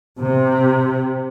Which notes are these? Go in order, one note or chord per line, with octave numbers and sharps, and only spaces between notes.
C3